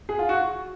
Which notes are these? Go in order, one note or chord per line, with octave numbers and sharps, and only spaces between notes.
G#4
F4
F#4